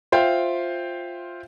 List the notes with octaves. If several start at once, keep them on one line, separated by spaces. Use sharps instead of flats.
F4 C5 E5 F5 G5